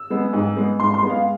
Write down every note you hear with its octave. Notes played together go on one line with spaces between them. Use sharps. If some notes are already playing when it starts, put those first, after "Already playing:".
Already playing: E6
G#3 B3
G#2
G#3 B3
G#2 C6
C6
G#3 B3
F5